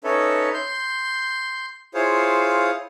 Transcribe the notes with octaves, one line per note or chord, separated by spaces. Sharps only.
C#4 D#4 A4 B4 C#5 E5
C6 G6
E4 F4 G#4 C5 C#5 F5